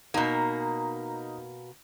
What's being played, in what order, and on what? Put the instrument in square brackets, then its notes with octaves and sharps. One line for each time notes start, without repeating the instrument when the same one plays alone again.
[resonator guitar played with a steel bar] B2 A#3 [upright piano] D#4 A#5